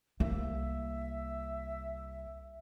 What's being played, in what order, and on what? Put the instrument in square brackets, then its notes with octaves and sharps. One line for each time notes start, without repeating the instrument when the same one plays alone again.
[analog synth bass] C2 [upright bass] A#3 [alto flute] E5